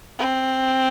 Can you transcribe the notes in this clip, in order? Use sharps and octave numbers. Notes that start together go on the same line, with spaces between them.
C4